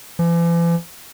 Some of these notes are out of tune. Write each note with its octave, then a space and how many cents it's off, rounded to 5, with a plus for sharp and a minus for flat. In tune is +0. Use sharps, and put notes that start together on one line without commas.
E3 +45